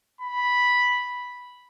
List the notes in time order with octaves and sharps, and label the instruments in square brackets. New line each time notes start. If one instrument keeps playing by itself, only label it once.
[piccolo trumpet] B5